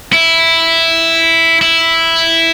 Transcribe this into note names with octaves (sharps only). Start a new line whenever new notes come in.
E4
E4